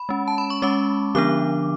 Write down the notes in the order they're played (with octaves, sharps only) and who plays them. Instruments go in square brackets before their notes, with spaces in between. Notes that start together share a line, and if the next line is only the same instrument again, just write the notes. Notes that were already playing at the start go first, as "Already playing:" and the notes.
Already playing: [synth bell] B5
G#3 C#4
A5
B5
C#6
G#3 C#4 D6
D3 F3 B3 D4 D6